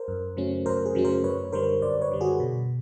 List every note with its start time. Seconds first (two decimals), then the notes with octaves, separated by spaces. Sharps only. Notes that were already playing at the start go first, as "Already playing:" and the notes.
Already playing: A#4 C5
0.08 F#2
0.37 C#3 F#3 A3 C#4
0.66 F#2 A#4 C5
0.86 G#4 A#4
0.95 C#3 F#3 A3 C#4
1.05 A#4 C5
1.24 F#2 B4 C#5
1.52 D3 G3 A#4 C5
1.82 F#2 C5 D5
2.01 B4 C#5
2.11 D3 G3
2.21 F#4 G#4
2.40 B2